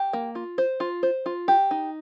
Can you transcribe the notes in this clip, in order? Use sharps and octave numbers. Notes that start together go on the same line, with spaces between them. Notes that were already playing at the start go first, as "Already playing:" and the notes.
Already playing: G4
A#3
F4
C5
F4
C5
F4
G4
D#4